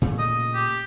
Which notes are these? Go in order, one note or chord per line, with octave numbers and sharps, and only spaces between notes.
A#2 C#3 A3
D#5
G4